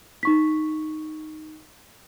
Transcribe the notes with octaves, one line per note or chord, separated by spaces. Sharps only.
D#4 C#6 B6